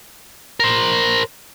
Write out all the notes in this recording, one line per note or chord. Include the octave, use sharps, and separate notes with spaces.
A#4 C5